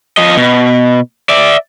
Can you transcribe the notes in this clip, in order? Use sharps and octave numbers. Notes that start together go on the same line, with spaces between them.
F3 D#5
B2
D5 E5